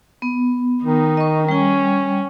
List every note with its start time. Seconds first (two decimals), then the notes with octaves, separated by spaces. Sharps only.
0.22 B3
0.84 D#3 D#4
1.17 D#5 C#6
1.48 G3 C#4 G5